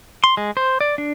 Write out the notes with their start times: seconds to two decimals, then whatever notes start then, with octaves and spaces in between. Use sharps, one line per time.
0.24 C6
0.37 G#3
0.57 C5
0.81 D5
0.98 D4